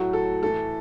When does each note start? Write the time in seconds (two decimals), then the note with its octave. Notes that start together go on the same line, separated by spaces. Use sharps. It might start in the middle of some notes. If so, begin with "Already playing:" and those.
Already playing: A2 F#3 A3 F#4
0.13 A4
0.42 A2 E3 A3 A4